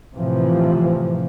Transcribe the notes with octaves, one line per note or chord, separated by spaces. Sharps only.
A2 C3 E3 F3